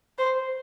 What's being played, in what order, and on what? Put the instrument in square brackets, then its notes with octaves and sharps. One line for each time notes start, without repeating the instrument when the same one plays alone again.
[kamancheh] C5